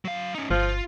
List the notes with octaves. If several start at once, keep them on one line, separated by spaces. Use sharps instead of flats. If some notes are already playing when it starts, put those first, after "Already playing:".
F#3 F5
C#4 D#4
G1 F3 F4